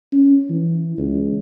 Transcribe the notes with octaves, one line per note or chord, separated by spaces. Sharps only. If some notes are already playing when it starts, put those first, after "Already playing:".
C#4
E3
C#2